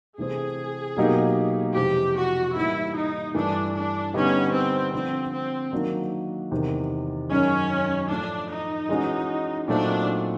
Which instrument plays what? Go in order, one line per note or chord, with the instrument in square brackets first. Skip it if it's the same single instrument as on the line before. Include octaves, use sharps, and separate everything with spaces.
[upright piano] C3 E3 A3 C4 [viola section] G#4
[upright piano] B2 F#3 A#3 D#4 G4
[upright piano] F2 C3 E3 G#3 C4 [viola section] G4
[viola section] F#4
[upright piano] A2 E3 G3 A#3 D#4 [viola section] E4
[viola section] D#4
[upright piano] G2 E3 A3 [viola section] D4
[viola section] D4
[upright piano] D3 G3 B3 D#4 G4 [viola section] C#4
[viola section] C4
[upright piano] D3 F3 A3 D4 [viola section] C4
[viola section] C4
[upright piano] D#3 F#3 A#3 D4
E2 C3 D#3
[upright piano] F#2 D#3 G#3 [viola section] C#4
[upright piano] A2 F3 A3 [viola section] D4
[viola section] D#4
[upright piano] E3 G#3 C#4 F#4
[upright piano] A#2 F#3 A3 C4 D#4 [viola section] D4